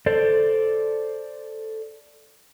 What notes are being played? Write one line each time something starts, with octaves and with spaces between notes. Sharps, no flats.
A4 C5 D5